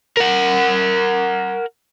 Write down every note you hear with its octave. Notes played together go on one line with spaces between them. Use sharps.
A#4 F#5